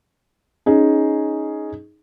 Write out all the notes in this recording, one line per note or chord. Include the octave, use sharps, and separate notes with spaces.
C#4 D#4 G#4